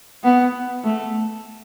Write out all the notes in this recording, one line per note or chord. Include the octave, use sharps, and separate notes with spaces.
B3
A3